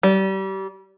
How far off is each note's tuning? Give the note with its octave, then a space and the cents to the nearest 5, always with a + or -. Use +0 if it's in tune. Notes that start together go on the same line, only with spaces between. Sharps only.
G3 -30